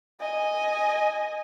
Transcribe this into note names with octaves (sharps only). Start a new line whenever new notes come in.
D#5 G#5